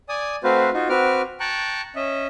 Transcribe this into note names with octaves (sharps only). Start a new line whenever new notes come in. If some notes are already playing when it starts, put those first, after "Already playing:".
D5 G#5 D#6
A3 C4 F#4 B4 C5 F5
D#4 F4 F#4
C4 F#4 B4 D6 F6
G5 A5 A#5 C#6 F#6
C#4 D#5 E5